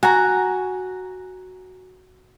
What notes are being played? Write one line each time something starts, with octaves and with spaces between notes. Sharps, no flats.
F#4 G#5 A#5